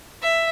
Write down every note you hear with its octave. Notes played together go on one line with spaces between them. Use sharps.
E5